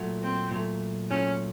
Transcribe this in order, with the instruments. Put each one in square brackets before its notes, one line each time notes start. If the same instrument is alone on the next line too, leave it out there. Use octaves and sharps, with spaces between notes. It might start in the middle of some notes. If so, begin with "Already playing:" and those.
Already playing: [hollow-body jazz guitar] A#2 F#3 A3
[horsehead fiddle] C4
[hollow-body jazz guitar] A#2 F#3 A3
[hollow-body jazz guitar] A#2 F#3 A3 [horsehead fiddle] C#4